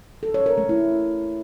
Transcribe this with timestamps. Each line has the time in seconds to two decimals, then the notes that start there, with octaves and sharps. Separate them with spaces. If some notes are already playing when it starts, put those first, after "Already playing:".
0.23 A4
0.34 C#5
0.46 A#4
0.58 A3
0.69 E4